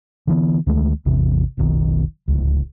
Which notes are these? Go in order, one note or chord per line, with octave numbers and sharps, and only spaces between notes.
D3 E3 B3
D2 D#3 G#3 A3
A1 E2 C3 E3
F1 B1 D#3
D1 C#2